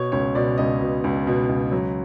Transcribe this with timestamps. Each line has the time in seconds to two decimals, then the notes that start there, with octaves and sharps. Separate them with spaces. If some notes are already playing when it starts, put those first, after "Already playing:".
Already playing: B2 C#5
0.12 C#2 C#5
0.35 B2 D5
0.58 C#2 D#5
0.81 B2
1.04 C#2
1.27 B2
1.49 C#2
1.72 F#3